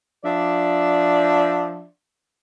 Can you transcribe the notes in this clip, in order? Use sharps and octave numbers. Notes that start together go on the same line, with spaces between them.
F3 D4 D5 E5